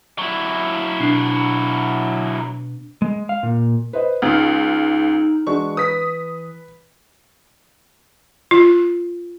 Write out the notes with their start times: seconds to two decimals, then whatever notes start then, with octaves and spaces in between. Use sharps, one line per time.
0.18 F#3 E4
1.00 B2 D4 C6
3.02 G#3
3.29 F5
3.43 A#2
3.93 B4 C5 D#5
4.22 C#2 D#4 D#6 F6
5.47 E3 G#3 D4 F#4 C#6
5.77 B4 D#6 B6
8.51 F4